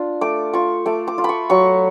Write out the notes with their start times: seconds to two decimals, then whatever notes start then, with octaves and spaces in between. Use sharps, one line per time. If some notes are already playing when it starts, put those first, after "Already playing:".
Already playing: D4 F4
0.21 A3 D6
0.53 F4 C#6
0.86 A3 D6
1.08 D6
1.18 F4
1.24 B5 C#6
1.50 F#3 C#6